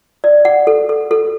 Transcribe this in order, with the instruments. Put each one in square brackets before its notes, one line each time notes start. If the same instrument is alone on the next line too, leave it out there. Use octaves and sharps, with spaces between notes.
[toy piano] D5
F#5
A4
A4
A4